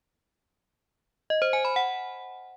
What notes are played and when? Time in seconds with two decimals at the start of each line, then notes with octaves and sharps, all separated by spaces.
1.30 D#5
1.42 C5
1.53 G#5
1.65 B5
1.76 F#5